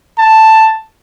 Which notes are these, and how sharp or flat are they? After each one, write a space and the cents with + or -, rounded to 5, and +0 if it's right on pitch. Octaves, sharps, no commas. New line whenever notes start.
A5 +5